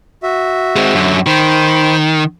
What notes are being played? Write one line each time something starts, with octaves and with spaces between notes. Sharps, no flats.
F#4 E5
G#3 C4
F#2 D3
D#3 C5 G5 B5